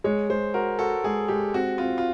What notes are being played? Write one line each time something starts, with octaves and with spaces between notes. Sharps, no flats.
G#3 C#5
G#3 C5
F#4 A#4
F#4 A4
G#3 G#4
G#3 G4
C4 F#4
C4 F4
F4